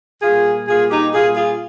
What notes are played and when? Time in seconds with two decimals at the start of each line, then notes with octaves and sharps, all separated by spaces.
0.22 A#2 G3 F4 G#4
0.67 A#2 G3 F4 G#4
0.90 D#4 G4
1.13 A#2 G3 F4 G#4
1.36 F4 G#4